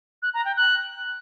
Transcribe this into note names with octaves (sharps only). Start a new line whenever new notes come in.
F#6
A#5
G5
F#6